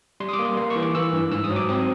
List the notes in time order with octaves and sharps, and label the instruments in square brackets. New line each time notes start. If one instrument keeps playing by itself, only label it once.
[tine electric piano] G3 C6
D#6
D6
A#3
C6
A#3 C6
C#6
E3
D6
E3 E6
G2
G#2 E6
D#6
F#3
D6
C4 D#6